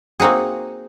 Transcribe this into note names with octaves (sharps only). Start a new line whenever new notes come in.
A#3 C4 D#4 F#4 G#4